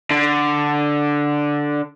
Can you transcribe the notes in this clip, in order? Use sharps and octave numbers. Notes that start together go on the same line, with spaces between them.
D3